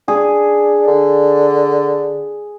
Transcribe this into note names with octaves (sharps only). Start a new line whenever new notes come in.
D4 G#4
D3